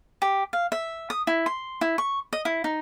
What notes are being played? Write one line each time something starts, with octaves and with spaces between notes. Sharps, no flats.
G4
F5
E5
D#6
E4
C6
E4
C#6
D#5
E4
D#4